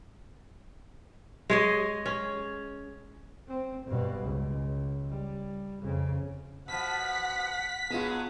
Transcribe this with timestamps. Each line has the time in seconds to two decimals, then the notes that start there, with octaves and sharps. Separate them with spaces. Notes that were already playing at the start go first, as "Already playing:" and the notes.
1.50 G#3 C#5 D#5
2.06 C#4
3.48 C4
3.85 G2 B2
4.24 C#2
5.09 G3
5.82 F2 C#3
6.68 B2 F3 F#5 B6
7.90 B2 F#3 G#3 B3 F4